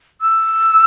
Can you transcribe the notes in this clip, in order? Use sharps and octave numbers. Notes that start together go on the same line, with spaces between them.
E6